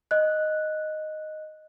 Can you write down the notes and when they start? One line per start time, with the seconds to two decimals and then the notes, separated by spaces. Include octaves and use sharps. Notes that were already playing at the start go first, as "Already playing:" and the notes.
0.11 D#5 F#6